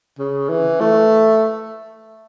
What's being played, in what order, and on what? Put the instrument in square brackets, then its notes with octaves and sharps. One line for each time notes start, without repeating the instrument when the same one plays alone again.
[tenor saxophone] C#3
E3
A3